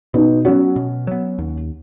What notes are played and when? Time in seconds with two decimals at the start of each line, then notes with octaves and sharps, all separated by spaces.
0.14 B2 B3 D#4
0.45 F#3 B3 C#4 F#4
0.76 B2
1.07 F#3 B3
1.38 D#2